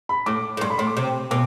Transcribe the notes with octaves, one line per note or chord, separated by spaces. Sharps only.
B5
A2 D6
A2
G2 C6
B5
A2 C6
D6
C3
B2 D6